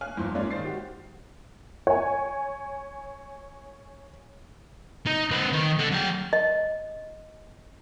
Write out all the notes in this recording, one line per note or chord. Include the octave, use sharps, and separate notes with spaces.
C#5 F5 G#5 F6 F#6
E2 G#2 F3 C6
G#2 G#3 A#3 C#4 F4 D5
D#3 G#3 C5 A6 C7
F#4 G4
C#5 G#5
D#4
C4 B4
D#3
D3
F#3 G5
D#5